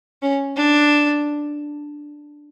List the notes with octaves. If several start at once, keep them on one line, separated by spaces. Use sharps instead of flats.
C#4
D4